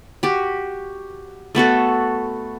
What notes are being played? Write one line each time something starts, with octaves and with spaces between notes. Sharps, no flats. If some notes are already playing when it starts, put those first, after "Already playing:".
F#4 G4
A3 B3 F#4 A4